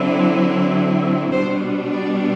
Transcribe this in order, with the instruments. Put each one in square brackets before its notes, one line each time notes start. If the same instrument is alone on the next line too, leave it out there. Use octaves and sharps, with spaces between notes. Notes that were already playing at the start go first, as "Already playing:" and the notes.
Already playing: [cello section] D3 F#3 C4 E4
B2 G3 B3 D4 C5
D5